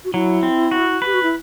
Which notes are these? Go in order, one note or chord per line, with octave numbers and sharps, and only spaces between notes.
F#4
F#3 E4
C4
F#4
G4 B4
F#4
E4